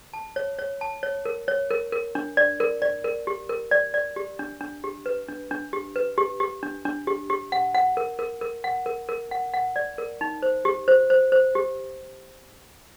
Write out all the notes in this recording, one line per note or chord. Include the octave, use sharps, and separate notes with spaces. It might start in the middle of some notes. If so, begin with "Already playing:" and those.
A5
C#5
C#5
A5
C#5
A#4
C#5
A#4
A#4
D4
D5
A#4
D5
A#4
G4
A#4
D5
D5
G4
D4
D4
G4
B4
D4
D4
G4
B4
G4
G4
D4
D4
G4
G4
F#5
F#5
A#4
A#4
A#4
F#5
A#4
A#4
F#5
F#5
D5
A#4
D#4
C5
G4
C5
C5
C5
G4